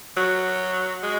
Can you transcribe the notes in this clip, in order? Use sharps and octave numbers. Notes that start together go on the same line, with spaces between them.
F#3 F#4
G#3